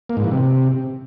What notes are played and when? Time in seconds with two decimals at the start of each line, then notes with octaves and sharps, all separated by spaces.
0.10 A#3
0.17 G#2
0.24 E3
0.31 C3